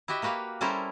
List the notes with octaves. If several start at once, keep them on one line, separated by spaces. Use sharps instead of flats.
E4 F#4 G4 D#5 E5
A#3 F#4 G4 B4 F5
G3 C#4 E4 A4 A#4 C5